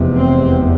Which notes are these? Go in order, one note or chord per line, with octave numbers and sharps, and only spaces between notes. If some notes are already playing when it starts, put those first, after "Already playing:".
Already playing: F1 E2 C3
C4